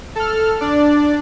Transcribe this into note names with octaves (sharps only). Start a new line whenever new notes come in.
A4 F6
D4 D5